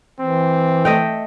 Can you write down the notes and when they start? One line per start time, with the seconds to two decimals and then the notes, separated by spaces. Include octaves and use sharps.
0.21 E3 C4
0.85 A3 D#5 G5